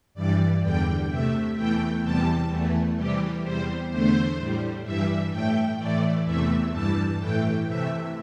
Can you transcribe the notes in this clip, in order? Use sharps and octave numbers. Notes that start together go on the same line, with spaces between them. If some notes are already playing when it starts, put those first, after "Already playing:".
G2 E3 G3 D5
E2 D3 G3 G5
C3 A3 E5
E2 E3 A3 G5
E2 C3 E3 G3 A5
E2 E3 A3
C3 E3 G3 G4
E2 C3 G3 C5
E2 D3 A3 C5
A2 G3
G2 E3 G3 E5
A2 A3 G5
A2 E3 A3 D5
E2 C3 E3 A3 E5
G2 E3 G3 A5
A2 E3 A3 G5
C3 E3 A3 E5